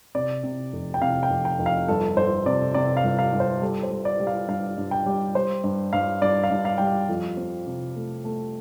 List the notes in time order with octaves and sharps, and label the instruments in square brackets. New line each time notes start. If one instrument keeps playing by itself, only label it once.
[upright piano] C3 D5
C3
F1
G5
C3 F5
G5
F1
G5
F1
F5
G1 A4
G1 C5
C3 D5
C3 D5
F5
G1
F5
G1
C5
G3 A4
C5
G3
D5
G3
F5
G2 F5
G2
G5
G3
G3 C5
G2
G2 F5
G2 D5
F5
G2
F5
G3 G5
F5
F2
C4
C3
A3
A3